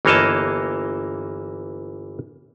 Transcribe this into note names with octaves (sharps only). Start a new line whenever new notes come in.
G1 E3 A#3 C#5 D#5 A5